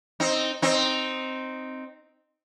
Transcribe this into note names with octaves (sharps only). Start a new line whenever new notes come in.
C4 D#4
C4 D#4